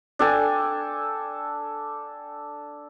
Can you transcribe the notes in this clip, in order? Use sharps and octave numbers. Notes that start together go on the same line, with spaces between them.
D4 A4 G5 G#5